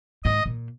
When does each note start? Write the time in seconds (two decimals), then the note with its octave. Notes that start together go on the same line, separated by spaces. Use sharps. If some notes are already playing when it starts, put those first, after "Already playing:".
0.24 G#2 D#5
0.46 A#2